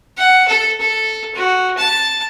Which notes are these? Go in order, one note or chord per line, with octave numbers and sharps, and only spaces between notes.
F#5
A4
A4
F#4
A5